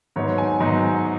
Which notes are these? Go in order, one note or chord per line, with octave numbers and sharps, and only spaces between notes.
G#2 F#3 B3 D#4 C#5
G#5
G#2 F#3 B3 D#4